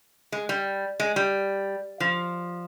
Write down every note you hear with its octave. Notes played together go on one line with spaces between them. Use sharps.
G#3
G3
G#3
G3
F3